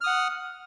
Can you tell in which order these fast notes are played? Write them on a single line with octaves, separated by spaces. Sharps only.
F6 D#6 F#5